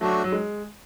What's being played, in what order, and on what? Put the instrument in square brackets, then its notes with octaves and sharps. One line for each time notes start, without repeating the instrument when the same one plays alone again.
[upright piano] F#3 [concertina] A3 D4 F#4
[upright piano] F#3
G#3